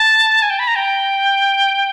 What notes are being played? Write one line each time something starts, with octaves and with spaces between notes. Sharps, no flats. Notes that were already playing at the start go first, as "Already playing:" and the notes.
Already playing: A5
G#5
G5
B5
A#5
G5